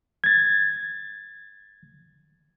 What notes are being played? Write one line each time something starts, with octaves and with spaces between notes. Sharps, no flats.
G#6 A6